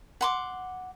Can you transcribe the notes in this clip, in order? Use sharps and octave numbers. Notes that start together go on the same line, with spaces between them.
F#5 C6 D6